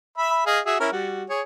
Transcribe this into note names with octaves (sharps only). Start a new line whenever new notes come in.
E5 B5
G#4 D#5 F5
F#4 G#4 E5
C#4 E4 A#4
G3 F#4
G#4 C#5